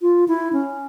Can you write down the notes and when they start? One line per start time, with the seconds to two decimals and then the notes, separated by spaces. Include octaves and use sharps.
0.02 F4
0.28 E4
0.53 C#4